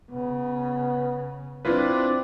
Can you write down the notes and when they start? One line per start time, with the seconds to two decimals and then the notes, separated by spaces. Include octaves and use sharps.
0.10 C#3 B3
1.65 C4 D4 E4 F4 B4